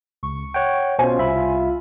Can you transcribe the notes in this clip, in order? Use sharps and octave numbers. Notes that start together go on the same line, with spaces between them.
C#2 C#6
C#5 F#5 G5
B2 C#4 F4 C5 G#5
C2 E5 B5
F4